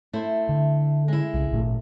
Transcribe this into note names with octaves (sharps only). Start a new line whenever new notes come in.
A3 E4 C5
D3
G#3 E4
C2 C#3
G#1 A#2 A3